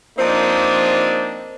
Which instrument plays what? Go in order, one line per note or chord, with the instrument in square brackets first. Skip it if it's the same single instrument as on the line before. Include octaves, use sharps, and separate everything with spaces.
[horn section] F3 A#3 C4 D4 D#4